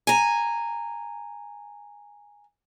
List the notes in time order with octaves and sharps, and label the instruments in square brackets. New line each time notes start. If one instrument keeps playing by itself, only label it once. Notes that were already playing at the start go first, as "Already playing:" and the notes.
[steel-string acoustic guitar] G#5 A#5